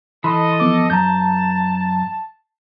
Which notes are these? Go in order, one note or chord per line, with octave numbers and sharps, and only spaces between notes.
E3 A4 D#5 B5 C6
F3 B3 D6
F#2 A5 A#5 G6